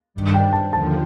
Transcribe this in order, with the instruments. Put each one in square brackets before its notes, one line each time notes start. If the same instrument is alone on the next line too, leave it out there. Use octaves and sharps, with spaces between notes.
[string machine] G2 D#3 G3 D4
[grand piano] G5
A5
[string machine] D#2 D3 F3 [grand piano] A5